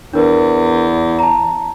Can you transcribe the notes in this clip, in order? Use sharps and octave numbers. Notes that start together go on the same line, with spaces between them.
E2 D4 A#4 B4
A5 A#5